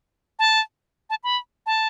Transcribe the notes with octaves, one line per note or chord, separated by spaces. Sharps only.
A5
A5
B5
A5